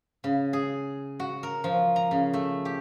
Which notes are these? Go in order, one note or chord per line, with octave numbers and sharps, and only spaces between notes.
C#3
G#4
F#4
A#4
F3
A#5
C#3
A3
G4